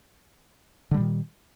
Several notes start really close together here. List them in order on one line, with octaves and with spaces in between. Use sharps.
D3 G3 A#2 D#3